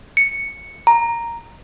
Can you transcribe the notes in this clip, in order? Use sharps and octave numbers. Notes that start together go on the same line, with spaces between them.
C#7
A#5